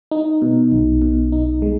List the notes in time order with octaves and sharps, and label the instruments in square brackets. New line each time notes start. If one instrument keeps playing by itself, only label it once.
[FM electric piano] D#4
B2
B1
B2
D#4
G#3